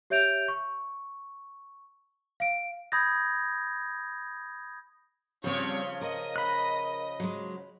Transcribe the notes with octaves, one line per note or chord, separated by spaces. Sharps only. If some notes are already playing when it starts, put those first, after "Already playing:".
G4 C#5 E5 G6 D7 F7
C#6
F5 D7
B5 D#6 G6 G#6 A#6
C#3 F3 G3 C4 C#5 G#6
A#4 D#5
B5 F#6
F#3 G#3